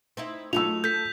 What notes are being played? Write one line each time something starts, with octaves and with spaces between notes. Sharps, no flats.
C4 D#4 E4
F#3 A3 D#4 F4 E6 F7
A4 G6 B6